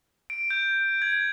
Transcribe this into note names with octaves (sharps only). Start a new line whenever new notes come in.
D7
G6
G#6